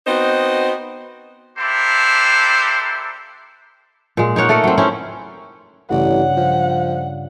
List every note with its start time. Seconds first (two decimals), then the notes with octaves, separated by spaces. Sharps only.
0.07 B3 C4 D#4 F#4 C5 D#5
1.58 A#3 D4 E4 G4 A4 C5
4.17 A#2 G#3
4.36 D#4 A#4 C#5 F#5
4.49 A3 A4 A#4 D#5
4.64 F#3 C4
4.78 C4 C#4 E4
5.90 A1 G2 C#3 D5 F#5
6.37 F3